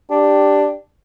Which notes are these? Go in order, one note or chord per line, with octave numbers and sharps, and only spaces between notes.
D4 G4